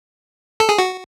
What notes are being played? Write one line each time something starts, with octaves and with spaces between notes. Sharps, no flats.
A4
G#4
F#4